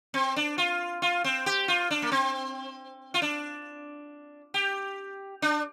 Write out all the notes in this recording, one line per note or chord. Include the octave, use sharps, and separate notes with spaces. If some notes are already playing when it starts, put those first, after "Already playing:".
C4
D4
F4
F4
C4
G4
F4
D4
A#3
C4
F4
D4
G4
D4